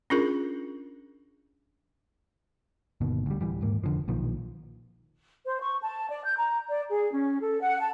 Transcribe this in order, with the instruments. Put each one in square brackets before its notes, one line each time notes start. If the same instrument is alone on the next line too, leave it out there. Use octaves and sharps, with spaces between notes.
[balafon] C#4 D4 F4 G#4 A#4
[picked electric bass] G1 D#2 B2 D#3
D2 G3
D1 E3 G3
D#1 G#2 A#3
F1 D3 F3
B1 A#2 D#3 F3
[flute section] C5
C#6
A5
D5
G6
A#5
D5
G#4
C#4
A4
F#5
A5